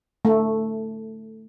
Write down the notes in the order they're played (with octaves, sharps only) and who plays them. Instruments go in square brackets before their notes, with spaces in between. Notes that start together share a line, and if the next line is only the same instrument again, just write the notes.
[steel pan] A3